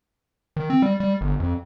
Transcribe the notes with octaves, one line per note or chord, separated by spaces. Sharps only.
D#3
C4
G3
G3
G1
F2